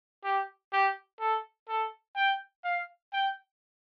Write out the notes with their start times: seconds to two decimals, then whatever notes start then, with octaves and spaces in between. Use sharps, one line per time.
0.24 G4
0.73 G4
1.20 A4
1.69 A4
2.16 G5
2.64 F5
3.13 G5